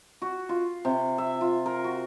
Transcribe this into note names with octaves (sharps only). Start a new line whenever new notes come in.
F#4
F4
C3
E5
F4
A#4
F#4